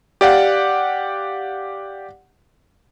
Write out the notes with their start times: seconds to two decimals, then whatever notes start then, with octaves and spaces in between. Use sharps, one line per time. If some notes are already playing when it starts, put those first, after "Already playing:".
0.21 G4 D5 F5 F#5